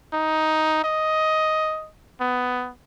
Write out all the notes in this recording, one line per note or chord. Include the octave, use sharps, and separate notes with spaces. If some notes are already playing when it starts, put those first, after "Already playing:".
D#4
D#5
B3